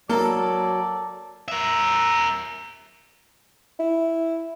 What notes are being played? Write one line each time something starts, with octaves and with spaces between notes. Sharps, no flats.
F#3 A#3 A4 D5
A#4 E5
E4